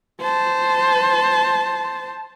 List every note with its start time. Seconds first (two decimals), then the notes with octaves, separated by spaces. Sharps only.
0.21 C5 A5